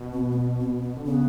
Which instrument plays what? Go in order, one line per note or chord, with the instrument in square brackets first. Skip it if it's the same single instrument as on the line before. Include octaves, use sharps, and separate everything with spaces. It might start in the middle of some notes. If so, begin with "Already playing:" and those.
Already playing: [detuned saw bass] B2
[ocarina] C4
A#3
B3
C4
B3
[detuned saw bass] D3
[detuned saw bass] C#3 [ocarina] B3